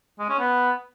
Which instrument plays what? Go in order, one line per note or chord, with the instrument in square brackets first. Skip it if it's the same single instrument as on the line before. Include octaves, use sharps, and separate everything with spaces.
[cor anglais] G#3
C#4
B3